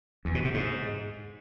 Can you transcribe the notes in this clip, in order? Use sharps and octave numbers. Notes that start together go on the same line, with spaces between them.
E2
B2
C3
G#2